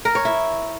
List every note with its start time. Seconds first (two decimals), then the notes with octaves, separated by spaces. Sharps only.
0.05 A#4
0.15 C#5
0.25 E4